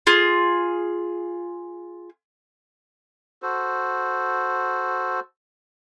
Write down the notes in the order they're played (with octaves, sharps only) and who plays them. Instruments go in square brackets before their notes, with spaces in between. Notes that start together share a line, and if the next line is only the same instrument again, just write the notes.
[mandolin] F4 G#4
[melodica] F#4 A4 C5